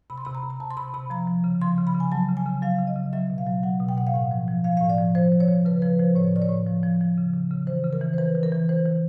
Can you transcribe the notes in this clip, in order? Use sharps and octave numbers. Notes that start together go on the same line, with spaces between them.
C3 B5
C6
C3 B5
A#5
C3
A#5
C3 A5
C6
C3 B5
C3 B5
F3 A#5
F3
C#3
F3 C6
C#3
B5
C#3
G#5
F#3 A5
C#3
G#5
C#3
F#3 F5
C#3
D#5
C#3
F#3 E5
B2
F5
F#3
F#3 F#5
B2
G5
B2 F#5
F5
A2 F#5
F3
F3
F3 F5
A2 F5
D5
F3
F3 C5
F3
C#5
F3
C#3 B4
F3 B4
F3 C5
A2 C#5
A2 D5
C#5
A2
F3
F3
F3
C#3
C#3
C#3
E3 C5
C#3
A#4
E3
C5
E3 B4
E3
A#4
E3
E3 C5
E3